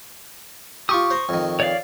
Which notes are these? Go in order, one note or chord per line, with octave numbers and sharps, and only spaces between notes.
F4 G4 C#6 D#6
C5 A#5
F2 D#3
C#5 D5 F5